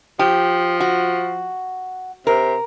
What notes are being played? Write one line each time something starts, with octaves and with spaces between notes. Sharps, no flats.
F3 G4
F#4
C3 A#4